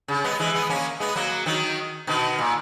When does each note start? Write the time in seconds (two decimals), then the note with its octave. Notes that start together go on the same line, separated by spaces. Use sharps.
0.08 C#3
0.24 G#3 B3
0.39 E3 G#3
0.54 G#3 B3
0.70 A#3 C#4
1.00 G#3 B3
1.16 F#3 A#3
1.46 D#3 F#3
2.07 B2 D#3
2.38 A#2